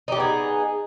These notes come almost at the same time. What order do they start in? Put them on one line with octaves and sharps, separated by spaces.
D#4 G4 B3 G#4